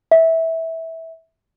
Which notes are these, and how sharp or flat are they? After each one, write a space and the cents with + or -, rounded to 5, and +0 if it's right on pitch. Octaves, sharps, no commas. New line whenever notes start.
E5 -15